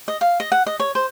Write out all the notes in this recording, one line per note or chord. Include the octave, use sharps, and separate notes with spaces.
D#5
F5
D#5
F#5
D#5
C#5
C5